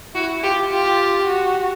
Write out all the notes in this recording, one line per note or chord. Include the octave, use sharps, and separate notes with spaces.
E4 F#4
F4 G4
F4 G4
F#4